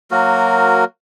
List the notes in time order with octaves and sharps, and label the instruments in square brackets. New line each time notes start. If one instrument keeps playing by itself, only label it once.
[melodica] F#3 A#3 F#4 A#4